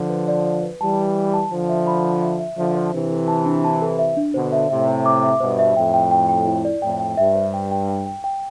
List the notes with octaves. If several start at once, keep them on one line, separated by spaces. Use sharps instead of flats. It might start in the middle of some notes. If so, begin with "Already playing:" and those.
Already playing: D3 F3
B4
D5
D5
B4
E3 G3 A5
D5
B4
A5
D3 F3 C5
E5
B5
C5
E5
E5
D3 F3 E5
C5
C3 E3 D4
A4
A5
D4
A5
A4
E5
D4
B2 D3 C5
E5
A2 C3 E5
C5
D6
E5
G2 B2 C5
E5
F2 A2 G5
G5
G5
G5
E4
D5
F2 A2 G5
G5
G2 E5
C5
G5
G5
G5
G5
G5